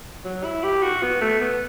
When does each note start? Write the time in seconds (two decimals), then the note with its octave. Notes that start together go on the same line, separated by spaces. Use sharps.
0.24 F#3
0.44 E4
0.63 G4
0.83 F#4
1.02 B3
1.21 A3
1.41 B3